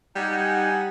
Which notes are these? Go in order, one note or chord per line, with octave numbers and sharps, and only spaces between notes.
G3 D#4 F#5 G#5